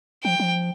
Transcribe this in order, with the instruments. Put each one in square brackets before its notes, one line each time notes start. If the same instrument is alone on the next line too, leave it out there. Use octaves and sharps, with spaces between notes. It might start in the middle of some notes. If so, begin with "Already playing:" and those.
[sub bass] F3 [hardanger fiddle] G5
[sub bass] F3